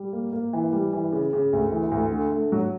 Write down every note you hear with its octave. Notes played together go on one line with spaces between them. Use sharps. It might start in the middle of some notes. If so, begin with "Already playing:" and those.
Already playing: G3
A#3
A#3
E3
G3
E3
C#3
C#3
D2
E3
D2
D3
A3
F#3